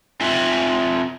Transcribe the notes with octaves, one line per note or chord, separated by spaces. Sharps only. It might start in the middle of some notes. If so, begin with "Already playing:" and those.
C4 F4 E5 G#5